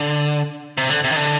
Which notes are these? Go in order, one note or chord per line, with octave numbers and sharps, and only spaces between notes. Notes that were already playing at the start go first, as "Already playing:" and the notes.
Already playing: D3
C3
D3
C3
D#3
D3